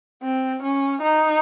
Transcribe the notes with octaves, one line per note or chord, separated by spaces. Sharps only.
C4
C#4
D#4